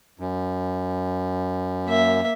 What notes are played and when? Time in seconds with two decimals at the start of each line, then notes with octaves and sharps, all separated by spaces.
0.19 F#2
1.87 A#3 E5